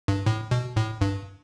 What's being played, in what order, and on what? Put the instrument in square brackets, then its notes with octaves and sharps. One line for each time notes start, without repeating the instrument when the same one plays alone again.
[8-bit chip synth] G2
A2
B2
A2
G2